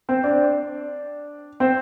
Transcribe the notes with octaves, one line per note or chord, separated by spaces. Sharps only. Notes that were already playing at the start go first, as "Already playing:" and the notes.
C4 C5
D4 D5
C4 C5